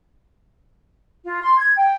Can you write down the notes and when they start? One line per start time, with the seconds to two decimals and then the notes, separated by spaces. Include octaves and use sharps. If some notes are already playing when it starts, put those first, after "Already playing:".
1.24 F4
1.43 C6
1.57 G#6
1.76 G5